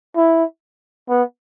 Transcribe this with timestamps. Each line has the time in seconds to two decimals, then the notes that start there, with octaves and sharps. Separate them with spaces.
0.16 E4
1.09 B3